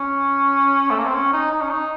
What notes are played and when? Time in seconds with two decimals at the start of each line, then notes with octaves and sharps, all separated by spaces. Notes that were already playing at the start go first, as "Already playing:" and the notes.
Already playing: C#4
0.91 A3
0.98 A#3
1.07 C4
1.14 C#4
1.33 D#4
1.52 D#4
1.61 C#4
1.70 D#4